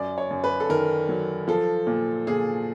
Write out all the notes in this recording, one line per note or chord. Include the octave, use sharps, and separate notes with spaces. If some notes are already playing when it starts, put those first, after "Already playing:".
Already playing: F#2 D5
C#5
F#2
B4
A4
D#3 A#4
F#3
F3 A4
A#2
A#2 G#4